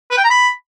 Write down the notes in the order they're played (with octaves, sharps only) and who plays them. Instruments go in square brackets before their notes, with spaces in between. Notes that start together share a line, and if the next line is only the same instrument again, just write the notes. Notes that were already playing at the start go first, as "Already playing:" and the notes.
[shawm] B4
G5
A#5
B5